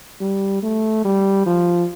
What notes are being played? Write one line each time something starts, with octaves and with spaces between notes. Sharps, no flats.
G3
A3
G3
F3